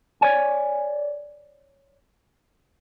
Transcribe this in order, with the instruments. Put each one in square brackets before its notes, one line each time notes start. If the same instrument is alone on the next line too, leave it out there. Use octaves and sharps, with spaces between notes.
[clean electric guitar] C#5 D5 G#5